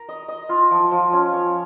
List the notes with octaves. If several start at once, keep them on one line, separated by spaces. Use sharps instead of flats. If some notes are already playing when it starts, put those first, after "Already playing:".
Already playing: A#4
D#5
D#5
F4
F3
F3
C#4
C#5